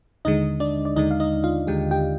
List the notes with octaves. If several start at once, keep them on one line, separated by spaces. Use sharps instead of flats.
D#2 D3 G#3 D#4 D#5
D4 D5
D5
D#2 D3 G#3 D#4 D#5
F5
D#4 D#5
F4 F5
D#2 D3 G#3 G4 G5
G4 G5